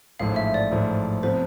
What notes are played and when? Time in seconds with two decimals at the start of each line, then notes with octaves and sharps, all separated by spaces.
0.19 A1 G#2 F3 A3 F5
0.36 E5
0.54 D5
0.72 A1 G#2 F3 A3
1.23 C3 F3 B3 C5